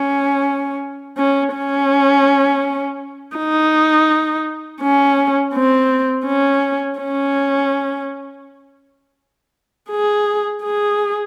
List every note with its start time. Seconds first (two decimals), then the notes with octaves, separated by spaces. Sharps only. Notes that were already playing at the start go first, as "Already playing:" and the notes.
Already playing: C#4
1.18 C#4
1.54 C#4
3.36 D#4
4.81 C#4
5.54 C4
6.26 C#4
6.99 C#4
9.90 G#4
10.63 G#4